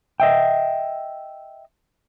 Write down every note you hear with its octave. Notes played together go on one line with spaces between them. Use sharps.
D#5 E5 G5